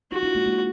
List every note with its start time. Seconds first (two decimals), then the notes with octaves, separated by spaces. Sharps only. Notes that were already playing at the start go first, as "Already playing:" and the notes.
0.12 D#4 F4 F#4
0.23 D4 E4
0.35 G#3 A#3
0.46 G#3 A#3